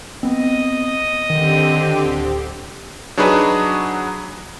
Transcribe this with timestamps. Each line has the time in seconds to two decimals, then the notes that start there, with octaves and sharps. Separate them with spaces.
0.23 B3 C4 D#5
1.30 D3 D#3 C4 G4
2.04 D1
3.17 F#3 D4 D#4 F#4 G#4 B4